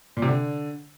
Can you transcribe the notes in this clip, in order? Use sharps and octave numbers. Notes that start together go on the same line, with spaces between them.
A#2
C3
D3